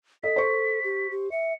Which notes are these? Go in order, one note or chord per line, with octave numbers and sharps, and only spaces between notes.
A4 D#5 B6
C5 C#6
G4
G4
E5 C#7